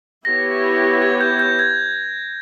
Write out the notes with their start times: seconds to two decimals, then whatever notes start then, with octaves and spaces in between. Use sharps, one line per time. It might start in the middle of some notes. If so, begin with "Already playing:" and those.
0.25 B3 E4 G4 C#5 A#6
1.02 G#6
1.21 G6
1.39 G6
1.59 G#6